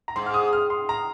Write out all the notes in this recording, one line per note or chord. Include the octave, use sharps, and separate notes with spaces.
A#5
G#2 C6
F6
D#6
F6
C6
A#5